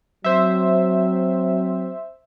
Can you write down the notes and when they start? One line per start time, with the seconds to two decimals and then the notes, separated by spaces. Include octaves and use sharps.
0.24 F#3 C4 C5 E5